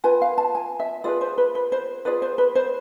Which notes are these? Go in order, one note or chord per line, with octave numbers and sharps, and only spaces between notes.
F4 B4 G#5
F5
A5
G#5
E5
F4 G#4 B4 D5
C5
B4
B4
C5
F4 G#4 B4 D5
C5
B4
C5